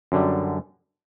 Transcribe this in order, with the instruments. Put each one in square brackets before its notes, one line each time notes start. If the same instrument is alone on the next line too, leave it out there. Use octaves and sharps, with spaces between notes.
[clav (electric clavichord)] F#2 D3 G3